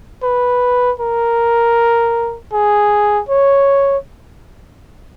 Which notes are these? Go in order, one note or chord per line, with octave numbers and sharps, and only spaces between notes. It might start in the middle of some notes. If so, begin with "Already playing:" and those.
B4
A#4
G#4
C#5